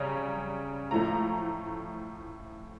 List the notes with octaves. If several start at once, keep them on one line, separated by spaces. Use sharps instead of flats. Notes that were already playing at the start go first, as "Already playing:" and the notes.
Already playing: C#3 G3 C#4 A#5
A2 F3 A3 A#5